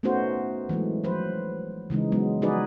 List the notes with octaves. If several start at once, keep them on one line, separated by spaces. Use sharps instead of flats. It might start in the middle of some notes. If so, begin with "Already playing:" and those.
A3 B3 C#4 D#4 F#4 C5
E3 F#3 G#3 A3
F3 F#3 B4 C5
C#3 E3 G#3 D#4
F#3 G#3 B3
F3 D#4 F#4 G#4 B4 D5